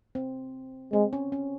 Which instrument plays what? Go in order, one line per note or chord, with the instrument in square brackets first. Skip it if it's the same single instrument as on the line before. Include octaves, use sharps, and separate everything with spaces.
[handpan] C4
[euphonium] G#3 [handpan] C4
[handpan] C#4
C#4